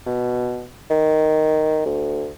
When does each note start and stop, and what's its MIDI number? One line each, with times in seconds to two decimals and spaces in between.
0.06 0.67 47
0.90 1.84 51
1.86 2.29 38